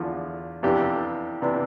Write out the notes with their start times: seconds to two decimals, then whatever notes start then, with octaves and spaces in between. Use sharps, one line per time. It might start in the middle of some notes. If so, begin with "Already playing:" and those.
Already playing: E2 D3 F3
0.63 F2 C3 E3 B3 D4 G4
1.42 C3 E3 B3 D4